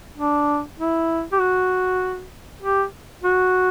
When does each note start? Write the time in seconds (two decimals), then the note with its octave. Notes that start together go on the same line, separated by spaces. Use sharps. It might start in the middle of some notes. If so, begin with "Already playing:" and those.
0.18 D4
0.79 E4
1.32 G4
1.40 F#4
2.62 G4
3.24 F#4